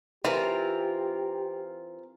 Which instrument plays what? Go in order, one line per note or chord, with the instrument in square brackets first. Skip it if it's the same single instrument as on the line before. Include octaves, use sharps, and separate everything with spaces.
[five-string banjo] E3 [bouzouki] C4 F4 A#4 [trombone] G4